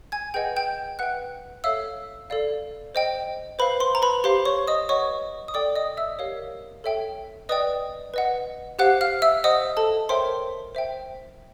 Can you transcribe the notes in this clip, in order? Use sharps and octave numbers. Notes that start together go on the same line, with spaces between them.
G#5 G#6
G#4 B4 D#5 F#5 G5 G6
G5 G6
B4 E5 F#5 G5 F#6
A4 C#5 E5 F5 E6
A4 D5 F5
C5 D#5 G5
B4 C5 F5 B5
C5 C6
A#5
B4 B5
G4 C5 F5 C6
C#5 C#6
D#5 D#6
B4 C#5 D#5 F#5 C#6
D#6
A4 D5 G5 D6
D#5 D#6
E5 E6
G4 A#4 C#5 F5
A4 C#5 E5 G5
B4 D5 D#5 G5 D#6
B4 D#5 F#5
G4 C5 F5 F#5 F#6
F5 F6
E5 E6
C5 D#5 F#5 D#6
A4 A5
A#4 C5 C#5 E5 G5 C6
C5 E5 G5